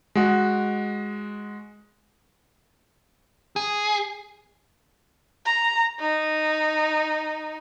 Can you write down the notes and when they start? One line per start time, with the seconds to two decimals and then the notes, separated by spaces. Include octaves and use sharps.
0.15 G#3 F#4
3.56 G#4
5.46 A#5
6.00 D#4